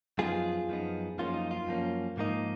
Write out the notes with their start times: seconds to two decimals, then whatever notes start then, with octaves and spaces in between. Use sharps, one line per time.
0.18 F#2 F3 B3 D#4 F4 G#4
0.68 F#2 F3 B3 D#4
1.18 F#2 F3 A#3 C#4 F4
1.34 D#4
1.51 F4
1.67 F#2 F3 A#3 C#4
2.17 G#2 F3 A#3 D#4